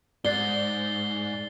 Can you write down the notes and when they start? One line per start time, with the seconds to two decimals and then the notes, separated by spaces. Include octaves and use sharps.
0.25 G#2 D5 A6 C7 G7